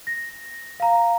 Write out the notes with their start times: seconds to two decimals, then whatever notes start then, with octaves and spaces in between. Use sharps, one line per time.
0.07 A#6
0.80 F5 A#5